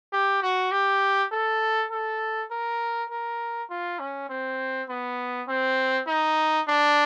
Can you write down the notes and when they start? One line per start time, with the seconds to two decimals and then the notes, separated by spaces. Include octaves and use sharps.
0.13 G4
0.42 F#4
0.72 G4
1.32 A4
1.91 A4
2.51 A#4
3.10 A#4
3.70 F4
4.00 C#4
4.29 C4
4.89 B3
5.48 C4
6.07 D#4
6.68 D4